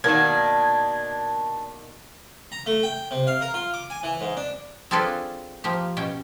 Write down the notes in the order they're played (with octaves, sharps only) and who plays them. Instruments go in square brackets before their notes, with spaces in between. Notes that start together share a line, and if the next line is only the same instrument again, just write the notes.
[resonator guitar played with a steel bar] B2 D#3 A#3 [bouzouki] D4 [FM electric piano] G#6
[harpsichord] A#5
A3
G5
C3
F5
A#4
F4
D6
G#5
E3
G#2
D4
[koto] C4 D4 F4 G#4 A4 B4
F3 A#3 G4
B2 C#4 G5